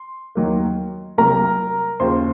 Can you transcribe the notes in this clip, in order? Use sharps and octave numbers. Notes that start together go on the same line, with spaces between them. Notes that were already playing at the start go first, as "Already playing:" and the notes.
Already playing: C6
D#2 D#3 F#3 A#3
C2 C3 F#3 A#3 A#4 A#5
D#2 C#3 F3 C5 C6